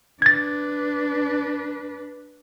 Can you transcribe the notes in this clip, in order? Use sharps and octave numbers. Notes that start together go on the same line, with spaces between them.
D4 B4 G#6 A6